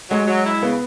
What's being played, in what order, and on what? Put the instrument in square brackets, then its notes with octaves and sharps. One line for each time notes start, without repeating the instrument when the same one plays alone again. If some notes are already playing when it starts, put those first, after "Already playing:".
[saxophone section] F#3 [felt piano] G#3
[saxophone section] F#3
E4
[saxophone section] C#3 [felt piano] B3